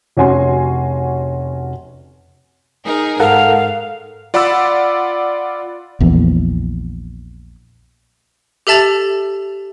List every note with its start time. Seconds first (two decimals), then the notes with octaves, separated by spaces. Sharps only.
0.17 F1 C#4 F#4 G#5 C6
2.85 D#4 G#4 A#4
3.20 G#2 A4 A#4 F5 F#5
4.34 F4 D5 F#5 B5 D6 E6
6.00 A#1 E2
8.67 G4 A4 E5 A5 A6 F#7